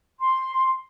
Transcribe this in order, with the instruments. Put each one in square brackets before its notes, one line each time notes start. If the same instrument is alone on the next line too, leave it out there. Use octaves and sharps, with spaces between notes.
[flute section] C6